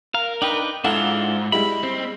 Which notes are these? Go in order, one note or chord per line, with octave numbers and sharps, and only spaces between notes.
A#4 F5
D4 D#4 B4 G5
G#2 D4 E4 F4 A4 F5 F#5
G3 G#3 E4 B5
C4